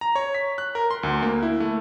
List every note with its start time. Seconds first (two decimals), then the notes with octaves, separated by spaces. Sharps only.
0.01 A#5
0.16 C#5
0.35 B6
0.58 F#6
0.75 A#4
0.91 C6
1.03 D2
1.22 A#3
1.43 E4
1.60 A3